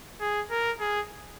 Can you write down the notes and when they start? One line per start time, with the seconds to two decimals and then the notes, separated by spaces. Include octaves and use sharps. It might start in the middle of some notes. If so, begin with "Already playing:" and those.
0.20 G#4
0.51 A#4
0.80 G#4